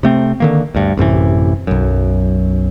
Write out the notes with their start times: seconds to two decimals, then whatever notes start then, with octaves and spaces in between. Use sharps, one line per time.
0.03 C3 A3 C4
0.40 D3 D#3 A#3
0.75 D2 G2
0.97 A1 F#2 C3 E3
1.67 B1 F#2